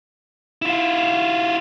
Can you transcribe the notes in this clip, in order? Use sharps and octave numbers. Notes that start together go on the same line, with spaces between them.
E4 F4